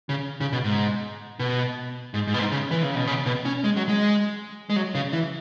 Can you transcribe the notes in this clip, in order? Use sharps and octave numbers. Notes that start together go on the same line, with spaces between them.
C#3
C#3
B2
G#2
B2
G#2
G#2
B2
G#2
C#3
E3
C#3
B2
C#3
B2
C#4
G#3
F#3
G#3
G#3
F#3
C#3
E3